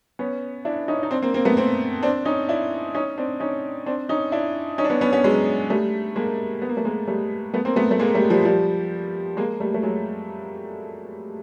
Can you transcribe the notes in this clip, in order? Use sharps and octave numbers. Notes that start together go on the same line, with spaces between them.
B3 C#4
D4 E4
C#4 D#4
D#4
C4 D4
A#3 C4
A#3 C4
A3 B3
A#3 C4
C4 D4
C#4 D#4
D4 E4
C#4 D#4
C4 D4
C#4 D#4
C4 D4
C#4 D#4
D4 E4
C#4 D#4
D4
B3 C#4
B3 C#4
B3 C#4
F#3 G#3
G3 A3
G#3 A#3
B3
A#3
A3
G#3 A#3
G3 A3
A3 B3
A#3 C4
A3 B3
A3
G#3 A#3
G3 A3
F3 G3
F3 G3
G#3 A#3
G3 A3
A3
F#3 G#3